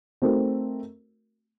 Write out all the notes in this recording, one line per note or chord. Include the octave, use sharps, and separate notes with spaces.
A3 C4 D#4 F#4 A#4